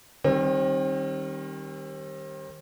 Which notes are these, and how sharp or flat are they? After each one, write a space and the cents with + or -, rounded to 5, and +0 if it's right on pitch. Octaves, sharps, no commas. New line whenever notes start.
D#3 +0 G3 +0 C4 +40